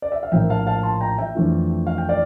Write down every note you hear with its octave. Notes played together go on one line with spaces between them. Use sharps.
D5
E5
F5
A#1 A2 F3 A#3 E5 G5
F5 A5
F5 A5
A5 C6
G5 A#5
E5 G5
F2 E3 A3 D4 F4
F5
G5
D5 F5